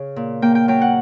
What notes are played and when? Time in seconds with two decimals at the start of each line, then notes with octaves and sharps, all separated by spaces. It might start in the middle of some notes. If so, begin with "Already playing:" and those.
Already playing: C#3
0.16 A#2
0.42 A#3 G5
0.55 G5
0.68 F#3 G5
0.81 F#5